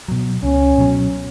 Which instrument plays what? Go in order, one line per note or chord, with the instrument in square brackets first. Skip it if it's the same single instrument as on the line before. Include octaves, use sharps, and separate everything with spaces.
[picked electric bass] B2 F#3
[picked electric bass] C#2 [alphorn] C#4
[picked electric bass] B2 F#3